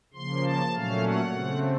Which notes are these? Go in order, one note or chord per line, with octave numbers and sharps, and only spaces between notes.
C#3 F3 A#3 C6
A5
A#2 F#3 A3 C#4 F5
F#5
C#3 A3 C4